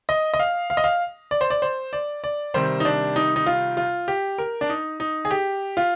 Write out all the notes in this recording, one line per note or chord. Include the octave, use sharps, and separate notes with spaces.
D#5
D#5
F5
F5
D#5
F5
D5
C5
D5
C5
D5
D5
C3 D#3 G3 C5
D#4
D4
D#4
D#4
F4
F4
G4
A#4
D4
D#4
D#4
G#4
G4
F4